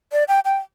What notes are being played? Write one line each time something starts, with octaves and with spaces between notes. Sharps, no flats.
D5
G5
G5